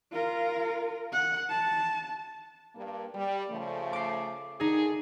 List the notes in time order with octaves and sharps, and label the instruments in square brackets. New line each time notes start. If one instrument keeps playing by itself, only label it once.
[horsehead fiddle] F4 A#4
F#5
A5
[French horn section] G2 A#3
G3
C#3 F3 A3
[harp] D6 C7
[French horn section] D3 D#3 G#4 [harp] D#4